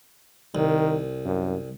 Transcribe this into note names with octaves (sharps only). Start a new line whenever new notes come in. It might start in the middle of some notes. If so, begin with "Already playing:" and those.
C2 D#3
F#2